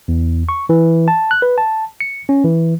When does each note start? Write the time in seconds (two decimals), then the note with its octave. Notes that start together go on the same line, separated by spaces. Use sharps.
0.08 E2
0.49 C#6
0.69 E3
1.08 A5
1.31 F#6
1.42 B4
1.58 A5
2.00 C#7
2.29 C#4
2.44 E3